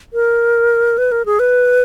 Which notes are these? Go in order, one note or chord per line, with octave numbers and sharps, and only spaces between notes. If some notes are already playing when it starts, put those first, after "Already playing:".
A#4
B4
A#4
G#4
B4